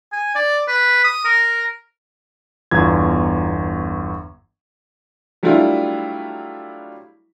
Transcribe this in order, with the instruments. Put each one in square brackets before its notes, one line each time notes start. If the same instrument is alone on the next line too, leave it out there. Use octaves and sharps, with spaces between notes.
[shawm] G#5
D5
B4
D#6
A#4
[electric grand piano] G1 E2 F4 A#5 G#6
[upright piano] F#3 G3 A3 D4 E4 F4